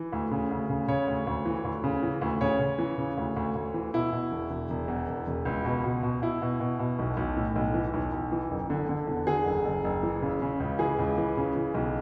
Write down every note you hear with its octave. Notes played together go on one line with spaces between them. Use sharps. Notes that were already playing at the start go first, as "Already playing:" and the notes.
Already playing: E3
D2
C#3
D2
C#3
C#3 C#5
D2
D2
E3
D2
C#3
E3
D2
C#3 C#5
C#3
E3
C#3
D2
D2
D2
E3
B2 E4
B2
E1
E1
E1
E2
E1
E1
C#2
B2
B2
B2
B2 E4
B2
B2
B2
B1
B1
A2
B1
E3
B1
B1
E3
F#1
D3
D3
E2
D3 G#4
F#1
F#1
F#1
E3
C#3
C#3
C#2
E3 G#4
C#2
E3
C#3
E3
B1